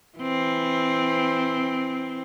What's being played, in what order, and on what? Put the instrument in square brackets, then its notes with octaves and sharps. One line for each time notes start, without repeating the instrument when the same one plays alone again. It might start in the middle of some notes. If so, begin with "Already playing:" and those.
[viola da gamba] E3 C4